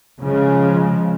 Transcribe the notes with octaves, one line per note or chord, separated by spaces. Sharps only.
C#3 F3 G#3